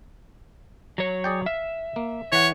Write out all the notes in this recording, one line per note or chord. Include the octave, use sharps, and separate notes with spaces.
F#3 C#5
G#4 D5 G5
E5 F5
A#3
E3 C#5 F#5